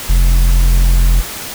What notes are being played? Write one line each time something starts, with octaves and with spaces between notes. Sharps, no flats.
F1